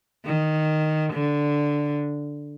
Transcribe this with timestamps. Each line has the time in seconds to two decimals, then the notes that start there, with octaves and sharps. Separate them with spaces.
0.26 D#3
1.13 D3